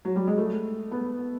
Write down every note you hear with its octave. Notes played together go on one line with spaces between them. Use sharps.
F#3
G3
G#3
A3
B3